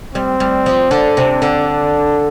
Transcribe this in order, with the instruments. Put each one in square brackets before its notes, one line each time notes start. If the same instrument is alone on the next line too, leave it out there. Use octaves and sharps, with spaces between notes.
[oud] G3 [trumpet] C4
[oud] G3
F3
[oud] D3 [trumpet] D4
[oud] C3
D3